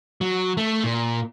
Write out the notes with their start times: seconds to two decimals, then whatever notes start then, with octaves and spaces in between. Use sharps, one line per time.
0.21 F#3
0.57 A3
0.84 A#2